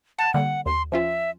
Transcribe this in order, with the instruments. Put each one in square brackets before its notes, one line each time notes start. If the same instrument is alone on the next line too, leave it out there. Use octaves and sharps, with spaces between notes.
[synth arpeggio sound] F#5 [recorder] A5
[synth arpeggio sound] D3 G3 A#3 [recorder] F#5
[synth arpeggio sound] D#2 [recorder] C6
[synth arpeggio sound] F3 C#4 F4 [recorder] E5